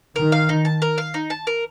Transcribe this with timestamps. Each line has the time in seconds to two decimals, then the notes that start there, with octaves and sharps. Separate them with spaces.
0.16 D#3 A#4
0.32 F5
0.49 D#4
0.65 A5
0.82 A#4
0.98 F5
1.14 D#4
1.30 A5
1.47 A#4